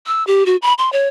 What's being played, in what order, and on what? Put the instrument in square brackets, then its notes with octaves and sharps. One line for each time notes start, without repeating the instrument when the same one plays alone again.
[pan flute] E6
G4
F#4
B5
C6
C#5